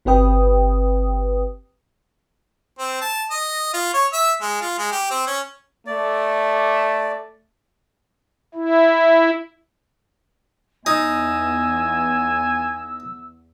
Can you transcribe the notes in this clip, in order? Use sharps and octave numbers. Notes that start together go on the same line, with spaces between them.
G1 C4 G4 B4 G5 D#6
C4
A5
D#5
F4
C#5
E5
G#3
F4
G#3
G4
C4
C#4
A3 D5
E4
E2 D#4 G#5 E6